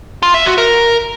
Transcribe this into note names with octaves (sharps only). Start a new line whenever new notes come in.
F4
E5
F#4
A#4